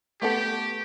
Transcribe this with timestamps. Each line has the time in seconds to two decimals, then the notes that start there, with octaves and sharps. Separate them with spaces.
0.21 A3 B3 G4 A4